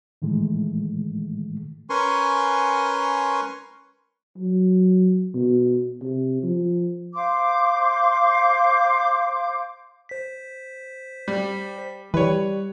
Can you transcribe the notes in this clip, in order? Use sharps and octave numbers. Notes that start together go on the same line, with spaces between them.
A2 D#3 E3 G#3 A3
C#4 A#4 B4 G#5 C6 C#6
F#3
B2
C3
F3
C5 F5 C6 D6
C5 B6
G3
E3 G3 B4 C#5